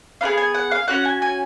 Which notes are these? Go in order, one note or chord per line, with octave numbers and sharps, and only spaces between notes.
B3 D#4 G#4 F5
G#5
F#5
F5
C#4 F#4 F#5
G#5
G#5